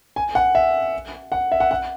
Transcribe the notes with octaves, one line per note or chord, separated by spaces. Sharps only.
G#5
F#5
E5
F#5
E5
F#5
F#5